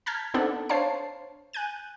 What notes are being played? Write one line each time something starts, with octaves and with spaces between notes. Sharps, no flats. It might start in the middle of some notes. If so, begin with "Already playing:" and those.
A5 A#5 F6 G6 G#6 B6
B3 C4 D4 D#4 A4 F#5
D4 C5 C#5 F5 A5 C7
G#5 F#6 G6 D#7